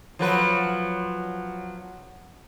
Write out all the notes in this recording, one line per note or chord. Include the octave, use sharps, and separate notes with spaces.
F3 F#3 B4